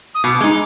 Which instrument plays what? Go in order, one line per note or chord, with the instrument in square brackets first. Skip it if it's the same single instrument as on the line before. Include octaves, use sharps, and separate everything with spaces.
[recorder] D#6
[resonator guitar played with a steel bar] B2 [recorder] D6
[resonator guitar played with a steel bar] G#3 D#4